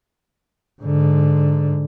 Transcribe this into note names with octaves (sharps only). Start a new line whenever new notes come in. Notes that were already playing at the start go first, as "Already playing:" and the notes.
G#2 D3